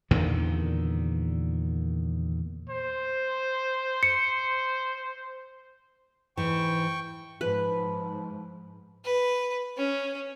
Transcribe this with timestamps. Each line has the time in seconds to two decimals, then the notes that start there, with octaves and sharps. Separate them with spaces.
0.11 E2 A#2 D3 D#3
2.69 C5
4.03 C#7
6.37 G#2 E3 G5 C#6
7.41 G#2 F3 B4
9.05 B4
9.77 C#4